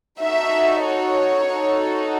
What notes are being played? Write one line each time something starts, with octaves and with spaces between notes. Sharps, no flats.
D#4 F#4 A4 E5
C#5
D#4 F#4 A4